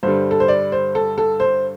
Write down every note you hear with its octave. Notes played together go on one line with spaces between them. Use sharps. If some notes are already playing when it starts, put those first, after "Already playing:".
G2 D3 G3 C5
A4
C5
D5
C5
A4
A4
C5